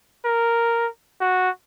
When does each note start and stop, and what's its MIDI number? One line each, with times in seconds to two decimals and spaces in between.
0.25 0.88 70
1.21 1.50 66